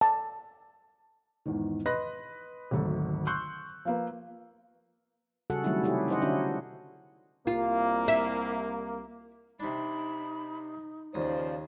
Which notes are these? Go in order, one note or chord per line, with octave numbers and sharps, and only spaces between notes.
A5
E2 G#2 D#3
B4 D#5 B5 C6 F#6 A#6
G#1 D2 F#3 A3 A4
C6 C#6 E6 F#6 G6
F3 A#3 B4
C#3 G3 F#4 G#4 A4 F#5
D#3 F#3 G3 A3 C4 E4
C3 C#4 E4 G4 G#4
D#4 E4 C5 D#5 F#5
D3 C#4 D4 E4 F#4
C2 A#3 F4
E5
C3 D4 D#4 B5
D#2 C#3 F3 C5 D5 D#6